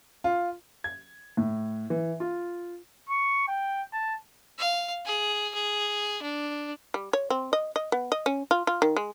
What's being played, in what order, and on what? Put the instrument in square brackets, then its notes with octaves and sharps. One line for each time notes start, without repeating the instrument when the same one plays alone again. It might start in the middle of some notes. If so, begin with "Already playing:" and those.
[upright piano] F4
G#6
A2
E3
F4
[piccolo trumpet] C#6
G5
A5
[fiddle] F5
G#4
G#4
D4
[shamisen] G3
C#5
C4
D#5
D#5
B3
D#5
C#4
F4
F4
D#3
G#3